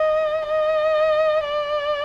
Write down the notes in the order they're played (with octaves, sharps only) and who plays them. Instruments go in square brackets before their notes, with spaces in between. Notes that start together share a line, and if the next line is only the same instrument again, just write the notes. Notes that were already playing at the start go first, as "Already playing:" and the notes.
Already playing: [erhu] D#5
D#5
D5